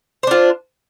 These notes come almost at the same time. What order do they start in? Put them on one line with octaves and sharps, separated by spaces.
C5 D4 F4